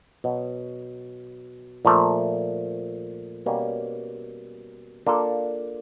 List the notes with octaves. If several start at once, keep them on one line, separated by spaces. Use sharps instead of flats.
B2 F#3 B3
A#2 F3 A3
B2 G3 A#3 C#4
A#3 D4 F4 A4